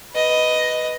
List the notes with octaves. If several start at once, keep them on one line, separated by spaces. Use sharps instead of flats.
B4 D#5